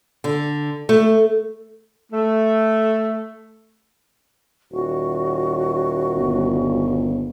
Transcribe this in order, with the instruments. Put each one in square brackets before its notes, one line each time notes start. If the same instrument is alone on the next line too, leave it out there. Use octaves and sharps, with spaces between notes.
[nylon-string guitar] D3
A3
[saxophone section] A3
[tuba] D#1 [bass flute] F#4
[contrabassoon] G1